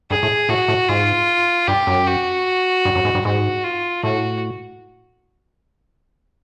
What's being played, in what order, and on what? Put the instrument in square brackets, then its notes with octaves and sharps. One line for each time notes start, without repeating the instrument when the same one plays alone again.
[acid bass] G2 [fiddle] G#4
[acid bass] A2
[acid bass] A2 [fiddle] F#4
[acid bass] A2
[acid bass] G#2 [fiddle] F4
[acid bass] G2 [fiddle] G4
[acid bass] F#2
[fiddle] F#4
[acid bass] G2
F#2
G#2
G2
[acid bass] G#2 [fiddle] F#4
[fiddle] F4
[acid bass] A2 [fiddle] F#4